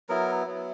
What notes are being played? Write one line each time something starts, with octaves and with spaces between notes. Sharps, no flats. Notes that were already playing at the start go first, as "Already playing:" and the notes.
F#3 B3 E4 A#4
F#3 B3 E4